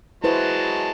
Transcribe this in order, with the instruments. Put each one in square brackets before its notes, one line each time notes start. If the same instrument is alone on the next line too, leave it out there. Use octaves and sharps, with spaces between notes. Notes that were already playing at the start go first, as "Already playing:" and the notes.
[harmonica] F#3 G#3 A5 [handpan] E4 B4 C5